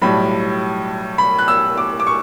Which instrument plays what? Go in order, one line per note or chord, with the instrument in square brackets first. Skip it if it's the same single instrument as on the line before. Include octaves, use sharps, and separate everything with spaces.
[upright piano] B1 A2 G3 B5
B5
F#6
E6
D6
D6
C#6